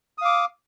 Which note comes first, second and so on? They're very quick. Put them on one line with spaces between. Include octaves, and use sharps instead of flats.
D#6 F5 D6